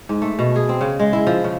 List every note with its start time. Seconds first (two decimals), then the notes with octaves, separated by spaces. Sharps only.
0.09 G#2
0.22 A3
0.39 B2
0.56 G#4
0.69 C4
0.81 C#3
1.00 G#3
1.13 E4
1.27 F3
1.44 C#3